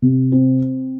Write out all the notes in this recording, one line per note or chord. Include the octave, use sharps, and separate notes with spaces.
C3
C4